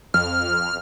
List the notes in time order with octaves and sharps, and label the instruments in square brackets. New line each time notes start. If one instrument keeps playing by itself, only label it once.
[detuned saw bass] F2 [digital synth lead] F6